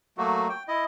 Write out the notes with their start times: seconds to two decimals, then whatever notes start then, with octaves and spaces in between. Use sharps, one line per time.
0.18 F#3 A3 A#3 F#4
0.50 G5
0.68 E4 D#5